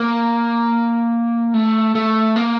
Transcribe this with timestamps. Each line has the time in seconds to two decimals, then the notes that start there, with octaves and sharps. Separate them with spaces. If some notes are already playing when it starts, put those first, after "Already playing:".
Already playing: A#3
1.54 A3
1.95 A3
2.36 A#3